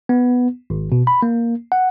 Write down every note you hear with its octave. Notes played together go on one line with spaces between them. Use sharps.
B3
G#1
B2
B5
A#3
F#5